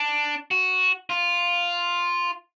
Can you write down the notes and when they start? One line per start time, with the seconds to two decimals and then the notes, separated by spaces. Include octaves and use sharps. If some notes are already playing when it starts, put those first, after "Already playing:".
Already playing: D4
0.51 F#4
1.10 F4